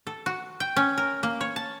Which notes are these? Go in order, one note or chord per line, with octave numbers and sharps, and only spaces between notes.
A4
F#4
G5
C#4
A#4
A#3
C#5
A5